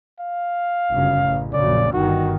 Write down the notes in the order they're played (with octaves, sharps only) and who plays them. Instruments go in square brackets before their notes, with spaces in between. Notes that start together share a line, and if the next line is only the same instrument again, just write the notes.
[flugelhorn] F5
[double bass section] G1 F#2 C#3
A1
[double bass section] A#1 F#2 C#3 [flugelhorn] D5
[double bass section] G1 G2 D#3 [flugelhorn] F#4